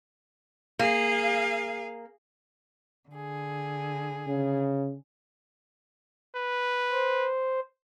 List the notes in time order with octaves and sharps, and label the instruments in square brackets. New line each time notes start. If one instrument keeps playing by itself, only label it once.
[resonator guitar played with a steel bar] A#3 [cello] G#4 F5
[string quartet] D3 G#4
[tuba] C#3
[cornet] B4
[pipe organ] C5